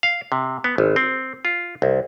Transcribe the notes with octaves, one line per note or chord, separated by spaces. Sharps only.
F5
C3
B3
G#1
C4
F4
C2